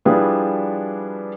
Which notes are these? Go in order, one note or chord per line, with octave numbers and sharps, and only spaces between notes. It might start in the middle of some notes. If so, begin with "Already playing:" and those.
F3 G3 D4 E4 G#4 B4